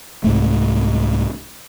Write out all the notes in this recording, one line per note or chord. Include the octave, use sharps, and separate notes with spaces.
C2 G#2 A3